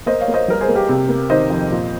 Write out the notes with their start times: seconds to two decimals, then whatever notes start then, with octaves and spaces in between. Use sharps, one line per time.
0.06 A#3 C5 D#5
0.20 C#5 F5
0.28 A#3
0.34 C5 D#5
0.48 G3 A#4
0.61 G#4 C5
0.68 A#3
0.75 G4 A#4
0.89 C3
1.09 A#3
1.30 D#3 C5 D#5
1.50 F2
1.71 A#2